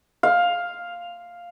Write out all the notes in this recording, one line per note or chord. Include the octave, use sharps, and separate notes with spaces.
F5